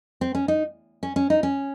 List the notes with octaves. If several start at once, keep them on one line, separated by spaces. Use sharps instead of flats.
C4
C#4
D#4
C#4
C#4
D#4
C#4